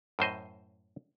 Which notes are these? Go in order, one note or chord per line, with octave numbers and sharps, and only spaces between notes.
F#2 A2 C5 D#5